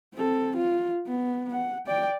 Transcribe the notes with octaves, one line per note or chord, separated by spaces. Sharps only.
C4 A4
F4
B3
F#5
D5 G5